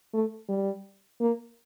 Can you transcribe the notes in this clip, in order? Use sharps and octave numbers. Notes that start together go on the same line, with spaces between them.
A3
G3
A#3